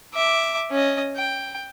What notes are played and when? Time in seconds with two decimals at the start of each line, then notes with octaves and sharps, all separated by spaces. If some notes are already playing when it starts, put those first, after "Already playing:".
0.14 E5 D6
0.71 C#4 D#5
1.16 G5